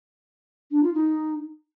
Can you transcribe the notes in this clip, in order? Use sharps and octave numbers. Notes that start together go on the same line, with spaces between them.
D4
F4
D#4